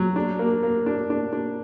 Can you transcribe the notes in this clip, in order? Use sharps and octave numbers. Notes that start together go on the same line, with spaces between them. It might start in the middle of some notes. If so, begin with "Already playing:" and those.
Already playing: F#3
D4
A#3
A#3
D4
D4
D4